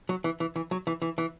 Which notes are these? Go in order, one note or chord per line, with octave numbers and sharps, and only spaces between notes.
F#3
E3
E3
E3
F#3
E3
E3
E3